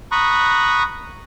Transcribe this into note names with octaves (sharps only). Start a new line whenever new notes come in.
A#5 B5 C#6 D#6 F#6